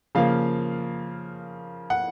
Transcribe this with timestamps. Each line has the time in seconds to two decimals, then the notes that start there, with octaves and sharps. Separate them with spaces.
0.15 C#3 F3 A#3 F5
1.90 F#5